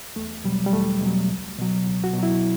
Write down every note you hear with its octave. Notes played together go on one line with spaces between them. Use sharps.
E2 A3
B2 F#3 G3
G3
E2 A3
B2
F#3
C#2
B2 F#3
C#2
F#4
B2
F#3 E4